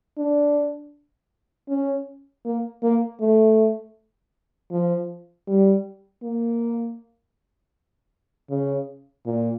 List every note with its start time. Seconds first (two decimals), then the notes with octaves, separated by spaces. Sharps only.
0.18 D4
1.69 C#4
2.45 A#3
2.83 A#3
3.21 A3
4.71 F3
5.48 G3
6.23 A#3
8.50 C#3
9.26 A#2